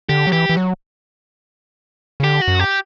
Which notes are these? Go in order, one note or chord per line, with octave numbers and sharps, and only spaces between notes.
D3 G4
F#3
E3 G4
E3
F#3
C#3
D3 G4
F#4
F#2
G4